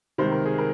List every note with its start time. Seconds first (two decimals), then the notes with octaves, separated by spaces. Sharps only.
0.18 C#2 C3 D#3 C5
0.32 A#4
0.45 G#4
0.58 A#4